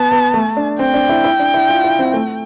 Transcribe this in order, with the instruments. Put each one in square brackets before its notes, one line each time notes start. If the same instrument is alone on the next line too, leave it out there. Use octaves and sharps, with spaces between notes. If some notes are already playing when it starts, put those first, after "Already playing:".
Already playing: [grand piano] B3 [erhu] A5
[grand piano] B3
A3
D4
[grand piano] C4 [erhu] G5
[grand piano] D4
E4
E4
D4
E4
F4
E4
C4
A3